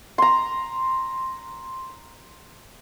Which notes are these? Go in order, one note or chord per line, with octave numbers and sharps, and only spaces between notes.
A#5 C6